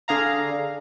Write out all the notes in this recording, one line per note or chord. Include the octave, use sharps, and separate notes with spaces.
D3 G#4 F5 A#5